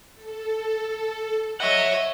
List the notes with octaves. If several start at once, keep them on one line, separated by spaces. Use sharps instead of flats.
A4
C#5 D#5 E5 F#5